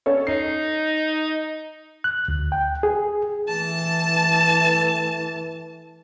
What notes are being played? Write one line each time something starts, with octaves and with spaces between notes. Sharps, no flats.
C#4 A4 C#5
D#4 C7
F#6
D2
G5
G#4
E3 A3 A5